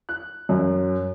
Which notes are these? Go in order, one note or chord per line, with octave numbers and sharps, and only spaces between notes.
F#6
F#2